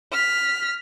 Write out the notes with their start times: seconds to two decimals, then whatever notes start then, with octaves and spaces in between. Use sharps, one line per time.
0.12 F6 B6